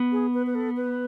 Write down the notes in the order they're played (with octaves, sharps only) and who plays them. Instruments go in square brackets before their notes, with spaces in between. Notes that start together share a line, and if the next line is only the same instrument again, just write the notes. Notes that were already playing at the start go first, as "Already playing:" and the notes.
Already playing: [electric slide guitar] B3
[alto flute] G#4
B4
B4
A4
B4